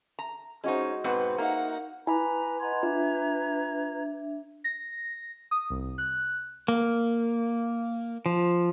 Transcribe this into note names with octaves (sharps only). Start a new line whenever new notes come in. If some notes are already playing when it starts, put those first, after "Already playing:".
A#5
G#3 C#4 D#4 F#4 C5
G#2 B2 C4 B4 F#5
A#3 D#4 A#4 E5 F#5
E4 B4 G#5 A#5 B5 D6
B4 D#5 F#5 A#5 C6 G#6
D4 F4 E5
A#6
D#6
C2
F#6
A#3
F3